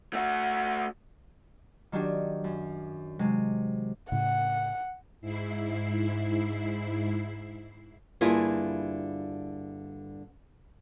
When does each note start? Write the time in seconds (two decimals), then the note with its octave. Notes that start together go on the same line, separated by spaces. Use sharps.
0.13 A3 F#4
1.92 D#3 F#3 D4 D#4 F#4 G4
2.44 F#2
3.19 C3 F#3 G#3
4.12 A2 C#3 F#5
5.21 G#2 E4 C7
8.21 G2 D3 A#3 E4 F4 G#4